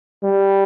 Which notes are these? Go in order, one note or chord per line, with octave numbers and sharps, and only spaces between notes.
G3